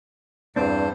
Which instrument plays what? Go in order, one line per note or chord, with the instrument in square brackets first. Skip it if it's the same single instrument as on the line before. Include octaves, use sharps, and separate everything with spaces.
[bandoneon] E2 G2 C5 [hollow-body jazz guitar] C4 D4